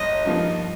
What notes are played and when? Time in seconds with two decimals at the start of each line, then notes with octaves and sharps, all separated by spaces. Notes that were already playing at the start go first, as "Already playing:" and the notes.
Already playing: G1 D#5
0.26 G2 F3 A#3 D#4